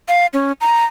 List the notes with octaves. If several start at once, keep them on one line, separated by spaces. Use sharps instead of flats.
F5
C#4
A#5